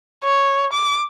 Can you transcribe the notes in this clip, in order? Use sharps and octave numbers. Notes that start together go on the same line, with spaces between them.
C#5
D6